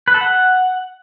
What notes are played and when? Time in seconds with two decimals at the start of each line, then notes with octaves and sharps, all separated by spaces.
0.08 B4
0.14 A4
0.21 F#5